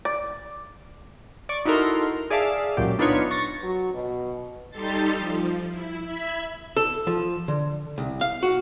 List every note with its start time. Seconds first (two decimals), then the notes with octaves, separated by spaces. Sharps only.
0.05 D5
1.49 D5 C#6 D7
1.66 D#4 E4 F#4 A4 A#4 C6
2.30 G#4 D5 E5 F5 A5
2.77 C#2 A#2 F#3 G4
2.99 B3 D4 D#4 F4 B4 C#5
3.31 C#6 A6 A#6 C#7
3.63 F#3
3.93 B2
4.70 G3 D#4 G4 A4 C6 A6
5.18 F3
5.69 E4
6.04 E5 B5 G#6
6.77 A4
7.07 F3
7.48 D3
7.98 C2
8.21 F5
8.43 F#4